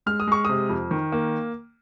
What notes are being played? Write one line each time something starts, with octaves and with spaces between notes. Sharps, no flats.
G#3 F6
D#6
G#3 C#6
C3 D#6
F2
D#3
A#3